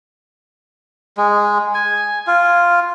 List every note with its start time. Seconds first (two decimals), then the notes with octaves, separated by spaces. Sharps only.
1.18 G#3
1.74 G#5
2.27 F4